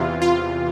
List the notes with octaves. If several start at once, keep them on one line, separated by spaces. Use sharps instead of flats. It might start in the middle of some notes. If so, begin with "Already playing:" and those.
Already playing: E2 C3 E3 F4
F4